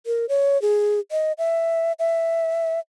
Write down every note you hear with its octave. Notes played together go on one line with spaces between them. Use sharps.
A#4
C#5
G#4
D#5
E5
E5